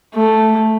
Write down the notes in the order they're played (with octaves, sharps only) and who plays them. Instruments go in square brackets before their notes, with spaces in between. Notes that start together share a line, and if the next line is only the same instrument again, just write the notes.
[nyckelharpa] A3